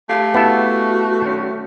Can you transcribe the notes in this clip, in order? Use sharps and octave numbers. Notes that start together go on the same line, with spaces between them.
A3 G4 G#4 F5
B3 E4 F#4 A4
D#3 C#4